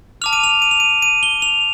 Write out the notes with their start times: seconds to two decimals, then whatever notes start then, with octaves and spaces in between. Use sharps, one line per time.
0.22 A5 D6 F6 F7
0.33 D#7
0.44 F7
0.62 D#7
0.71 F7
0.80 D#7
1.02 D#7
1.23 G7
1.42 F7